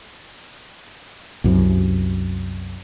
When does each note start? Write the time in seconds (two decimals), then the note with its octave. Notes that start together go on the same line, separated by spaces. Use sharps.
1.44 C2 F#2 C3